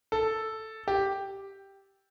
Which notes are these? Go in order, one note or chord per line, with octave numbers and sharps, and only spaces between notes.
A4
G4